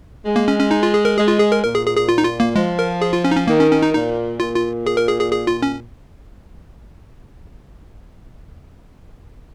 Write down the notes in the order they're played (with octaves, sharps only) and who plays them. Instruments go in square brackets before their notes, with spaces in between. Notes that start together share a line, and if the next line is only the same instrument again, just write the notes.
[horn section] G#3
[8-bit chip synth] A#3
C#4
C#4
D#4
F4
G#4
A#4
[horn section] G#3 [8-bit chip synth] G#4
[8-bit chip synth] F4
G#4
A#4
[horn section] A#2 [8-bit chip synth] A#4
[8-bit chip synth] G#4
G#4
G#4
F4
D#4
F4
A#3
[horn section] F3 [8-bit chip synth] G#3
[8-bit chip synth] A#4
G#4
F4
C#4
D#4
C#4
[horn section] D#3 [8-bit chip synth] A#3
[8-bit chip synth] C#4
C#4
D#4
[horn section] A#2 [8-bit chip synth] D#4
[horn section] A#2 [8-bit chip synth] F4
[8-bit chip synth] F4
G#4
A#4
G#4
G#4
G#4
F4
C#4